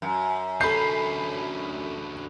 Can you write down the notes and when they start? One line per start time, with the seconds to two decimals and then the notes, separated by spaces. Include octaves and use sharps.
0.02 F#2
0.61 D2 C#4 A4 B5 G6 C7